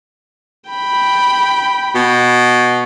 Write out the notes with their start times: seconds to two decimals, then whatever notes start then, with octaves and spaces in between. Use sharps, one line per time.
0.69 G5 B5
1.95 B2